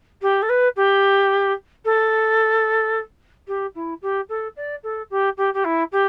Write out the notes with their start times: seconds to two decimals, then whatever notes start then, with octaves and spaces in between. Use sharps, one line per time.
0.21 G4
0.42 A4
0.49 B4
0.76 G4
1.85 A4
3.47 G4
3.74 E4
4.02 G4
4.29 A4
4.56 D5
4.83 A4
5.10 G4
5.37 G4
5.54 G4
5.64 E4
5.91 G4